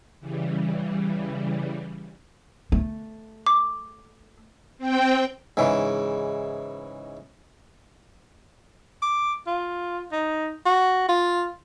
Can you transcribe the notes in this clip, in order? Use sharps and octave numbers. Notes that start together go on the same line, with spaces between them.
C#3 E3 G3
A3
D6
C4 G5
G#2 C#3 E3
D6
F4
D#4
F#4
F4